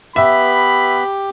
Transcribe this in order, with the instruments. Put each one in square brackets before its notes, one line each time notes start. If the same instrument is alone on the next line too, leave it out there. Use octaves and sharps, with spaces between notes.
[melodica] B3 B4 [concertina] G4 [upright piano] E5 [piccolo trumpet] B5